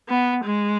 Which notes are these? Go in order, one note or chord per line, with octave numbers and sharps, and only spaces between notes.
B3
G#3